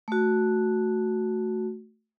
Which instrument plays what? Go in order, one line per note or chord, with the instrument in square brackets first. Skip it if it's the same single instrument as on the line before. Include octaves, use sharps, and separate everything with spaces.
[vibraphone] A3 F#4